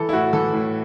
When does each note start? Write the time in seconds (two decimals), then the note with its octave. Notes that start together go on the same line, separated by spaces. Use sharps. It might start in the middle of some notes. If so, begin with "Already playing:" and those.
Already playing: E3 A4
0.09 E4
0.13 A2 F#4
0.33 E3 A4
0.53 A2